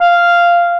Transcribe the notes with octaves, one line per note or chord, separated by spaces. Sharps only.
F5